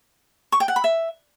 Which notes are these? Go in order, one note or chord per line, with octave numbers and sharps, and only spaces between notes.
C#6
G5
F#5
B5
E5